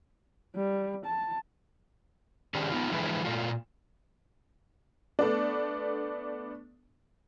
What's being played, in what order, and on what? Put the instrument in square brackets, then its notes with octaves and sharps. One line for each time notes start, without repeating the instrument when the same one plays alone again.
[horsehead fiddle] G3
A5
[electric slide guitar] D#3 C#4 D4 G4 G#4
B3 D#4 F4
D3 E3 F3 G#3 E4 B4
A#2 A3 F4
[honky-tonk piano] A3 B3 D4